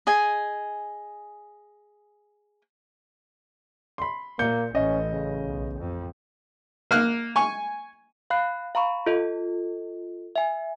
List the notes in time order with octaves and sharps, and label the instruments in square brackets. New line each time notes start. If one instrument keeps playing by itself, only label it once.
[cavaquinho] G#4 D#5 G#5
[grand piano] B5 C6
[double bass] A#2 [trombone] A#3 [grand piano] G6 C#7
[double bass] A1 [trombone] C#4 [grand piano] D#5
[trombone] C#3
[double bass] B1
F2
[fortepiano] A#3 F6 F#6
G#5 C#6
[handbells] F5 B5 F#6 C7
F5 A#5 B5 C#6
F4 A4 D#5
E5 G#5